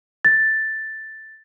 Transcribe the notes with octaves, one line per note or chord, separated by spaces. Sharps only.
A6